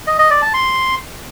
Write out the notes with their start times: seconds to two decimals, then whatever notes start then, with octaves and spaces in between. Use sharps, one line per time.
0.07 D#5
0.19 D#5
0.30 D5
0.42 A5
0.54 C6